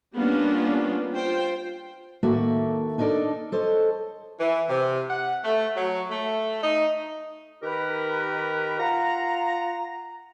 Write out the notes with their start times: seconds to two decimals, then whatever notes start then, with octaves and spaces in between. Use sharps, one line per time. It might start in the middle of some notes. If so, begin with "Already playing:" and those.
0.14 G3 A#3 B3 C#4 D4 F4
1.15 F4 C5 G5
2.23 D#2 A2 A#3 F#4 A4 E5
2.98 D4 D#4 A4 A#4 D5
3.52 A4 C5 C#5 D#5
4.40 E3
4.69 C3
5.10 F#5
5.44 A3
5.76 F#3
6.11 A3
6.63 D#4
7.63 D#3 G4 A#4 B4
8.80 F4 F#5 A#5